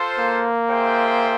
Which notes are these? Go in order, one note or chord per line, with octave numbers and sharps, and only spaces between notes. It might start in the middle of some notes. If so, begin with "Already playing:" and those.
Already playing: F4 A4 C5 F5
A#3
F4 G#4 C5 E5 G5